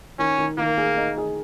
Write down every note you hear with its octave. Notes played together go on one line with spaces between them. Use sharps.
D#3 C#4
D#3
D#3 A#3
G#4
D#4
G#4